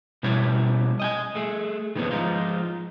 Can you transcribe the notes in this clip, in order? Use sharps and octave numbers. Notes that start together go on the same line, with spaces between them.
B2 G3 C#4 E4 C#5
D#5 G5 G#5
A3 G#4
D#3 E3 F#3 B3 C#4
F3 G#3 D#4 F4